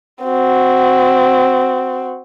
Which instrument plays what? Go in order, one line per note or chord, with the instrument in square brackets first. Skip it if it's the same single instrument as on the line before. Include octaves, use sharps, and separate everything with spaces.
[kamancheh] C4 F#4